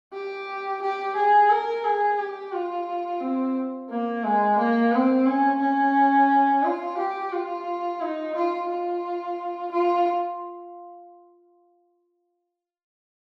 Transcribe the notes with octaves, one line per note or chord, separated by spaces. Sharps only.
G4
G4
G#4
A#4
G#4
G4
F4
C4
A#3
G#3
A#3
C4
C#4
C#4
F4
G4
F4
D#4
F4
F4
F4